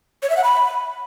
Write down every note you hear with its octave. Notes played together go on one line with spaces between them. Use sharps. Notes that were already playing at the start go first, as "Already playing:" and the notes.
C#5
E5
F#5
B5